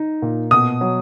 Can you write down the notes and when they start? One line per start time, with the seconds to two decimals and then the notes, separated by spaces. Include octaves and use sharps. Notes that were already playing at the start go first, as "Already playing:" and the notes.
Already playing: D#4
0.22 A#2
0.51 B2 D#6
0.81 F#3